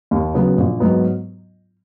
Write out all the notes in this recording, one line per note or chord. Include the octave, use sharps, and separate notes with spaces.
D#2
C#3 F#3 B3
A#1
G#2 F#3 B3